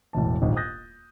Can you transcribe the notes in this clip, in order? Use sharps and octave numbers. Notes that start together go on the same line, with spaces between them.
E1 A1 E2 A5
D#1 A#1 G#2
D#6 F#6 G6 A6 A#6